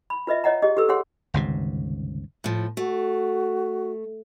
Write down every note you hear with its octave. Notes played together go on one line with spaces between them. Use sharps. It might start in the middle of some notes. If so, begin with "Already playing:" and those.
B5
F4 B4 D#5 E5
C#5 D#5 F#5 A#5
G4 G#4 D#5
G4 A4 B4 E6
G4 G#4 C#5 F#5 C6
G1 C#2 C3 D#3
A2 F3
A3 F#4